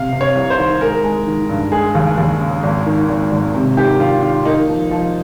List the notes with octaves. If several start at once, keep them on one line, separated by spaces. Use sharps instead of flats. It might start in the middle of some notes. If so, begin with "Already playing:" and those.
Already playing: C3 F5
C3
C#5
C2
C5
D#3
G#3 A#4
G#3
D#3
G2
G#3 G#4
D#2
D#2
C#3
G#1
D#3
G#1
G#1
C3
D#3 G4
D#3 F4
D#3 F4
A#3 D#4
F3
F3